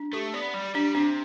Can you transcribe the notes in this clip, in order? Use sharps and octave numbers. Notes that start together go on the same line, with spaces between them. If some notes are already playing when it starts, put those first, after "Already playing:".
Already playing: D4
A3 G4
B3 D5
G3 D5
G3 D4
C3 D4